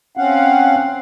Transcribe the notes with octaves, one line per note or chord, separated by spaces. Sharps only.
C4 C#4 F5 F#5